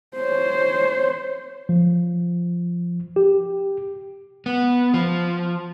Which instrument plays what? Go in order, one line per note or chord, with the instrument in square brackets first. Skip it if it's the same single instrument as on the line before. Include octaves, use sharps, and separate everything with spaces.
[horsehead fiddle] C5 C#5
[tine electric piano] F3
G4
[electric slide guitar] B3
F3